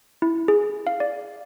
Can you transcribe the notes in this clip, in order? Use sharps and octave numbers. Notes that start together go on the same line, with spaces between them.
E4
G#4
F5
D5